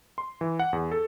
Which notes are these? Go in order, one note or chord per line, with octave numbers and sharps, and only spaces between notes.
C6
E3
F#5
E2
A4